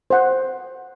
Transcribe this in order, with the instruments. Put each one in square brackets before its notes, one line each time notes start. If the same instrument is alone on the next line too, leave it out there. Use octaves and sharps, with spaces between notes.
[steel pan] C5 F#5